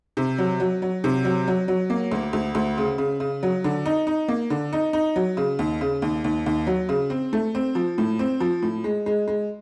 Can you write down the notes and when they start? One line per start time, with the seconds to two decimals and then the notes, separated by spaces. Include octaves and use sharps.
0.17 C3
0.38 F#3
0.60 F#3
0.82 F#3
1.04 C3
1.25 F#3
1.48 F#3
1.68 F#3
1.90 A#3
2.11 D2
2.33 D2
2.55 D2
2.78 C#3
2.98 C#3
3.20 C#3
3.43 F#3
3.64 D3
3.86 D#4
4.07 D#4
4.28 A#3
4.50 D3
4.73 D#4
4.93 D#4
5.16 F#3
5.37 C#3
5.59 D#2
5.81 C#3
6.02 D#2
6.24 D#2
6.46 D#2
6.67 F#3
6.89 C#3
7.10 C4
7.33 A3
7.55 C4
7.75 F3
7.98 A2
8.19 C4
8.40 F3
8.62 A2
8.84 G#3
9.06 G#3
9.28 G#3